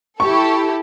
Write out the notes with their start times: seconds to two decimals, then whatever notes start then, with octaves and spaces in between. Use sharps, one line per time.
0.20 E4 G4 A4 C#6